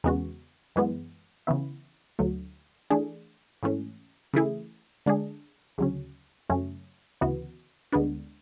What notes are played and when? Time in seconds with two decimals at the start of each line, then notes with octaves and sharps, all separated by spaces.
0.04 E2 C#3 G#3 B3 F#4
0.76 F#2 E3 G#3 B3
1.47 C#3 E3 B3 E4
2.19 D2 D3 F#3 A3
2.90 E3 A3 D4 G#4
3.63 G#2 E3 A3 C#4
4.34 C#3 E3 A3 E4 G#4
5.06 D3 G#3 D4 G#4
5.78 D2 C#3 F#3 C#4
6.49 F#2 C#3 F#3 A3 C#4
7.21 D2 C#3 E3 B3 F#4
7.92 D2 D3 G#3 B3 D4